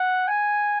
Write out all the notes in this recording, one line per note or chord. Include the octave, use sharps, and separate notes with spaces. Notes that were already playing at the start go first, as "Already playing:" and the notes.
Already playing: F#5
G#5